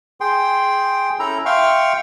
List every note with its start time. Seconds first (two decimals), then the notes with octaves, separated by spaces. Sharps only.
0.21 G#4 G5 C6
1.19 C#4 E4 A4 A#5
1.46 E5 F5 G5 C6 C#6 F6